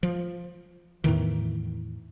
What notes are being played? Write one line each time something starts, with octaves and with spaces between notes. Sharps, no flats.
F3
E2 A2 D#3 E3